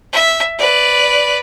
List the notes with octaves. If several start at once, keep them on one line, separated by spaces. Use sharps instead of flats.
E5
B4 D5